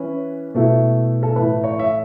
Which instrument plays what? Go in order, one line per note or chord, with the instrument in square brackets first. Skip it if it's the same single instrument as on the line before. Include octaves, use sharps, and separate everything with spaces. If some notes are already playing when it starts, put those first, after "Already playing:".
Already playing: [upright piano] E3 C#4 E4 B4
B2 A3 E4
A4
A2 E3 A3 B4
C#5
E5